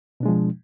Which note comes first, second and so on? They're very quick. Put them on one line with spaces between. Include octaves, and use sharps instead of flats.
B2 D4 G#3 F3